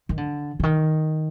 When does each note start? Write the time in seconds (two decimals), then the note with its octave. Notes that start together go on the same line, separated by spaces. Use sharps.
0.09 D#3
0.17 D3
0.60 D3
0.63 D#3